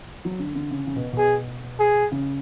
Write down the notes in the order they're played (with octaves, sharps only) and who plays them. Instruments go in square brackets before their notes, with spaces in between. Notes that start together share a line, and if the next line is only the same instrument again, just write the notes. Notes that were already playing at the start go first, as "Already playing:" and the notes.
[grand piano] F#3
D3
D3
C#3
C#3
B2
B2
[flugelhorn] G#4
G#4
[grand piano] C#3